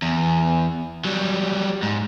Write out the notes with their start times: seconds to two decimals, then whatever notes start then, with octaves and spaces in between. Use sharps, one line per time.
0.02 E2
1.05 F#3 G3
1.82 G#2